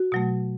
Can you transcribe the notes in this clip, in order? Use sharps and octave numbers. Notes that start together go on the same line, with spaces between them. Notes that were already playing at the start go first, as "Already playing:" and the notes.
Already playing: F#4
B2 F#3 A3